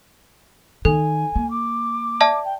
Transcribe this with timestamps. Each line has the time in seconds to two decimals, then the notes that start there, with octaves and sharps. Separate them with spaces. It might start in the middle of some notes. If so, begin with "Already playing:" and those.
0.85 D#3 A4 G#5
1.36 A#3
1.50 D6
2.21 D5 E5 A5
2.44 G5